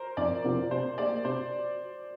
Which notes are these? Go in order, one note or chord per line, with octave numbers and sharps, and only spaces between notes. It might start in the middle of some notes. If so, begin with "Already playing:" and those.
Already playing: A#4 C5
F2 D5
C3 F3 C4 F4
C3 C5
A#3 G4 D5
C3 C5